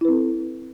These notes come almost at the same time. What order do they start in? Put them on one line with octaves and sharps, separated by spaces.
E4 B4 C4 A4